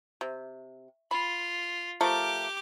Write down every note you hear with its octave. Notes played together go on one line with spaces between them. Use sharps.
C3
F4 B5
F3 A3 G4 A#4 D6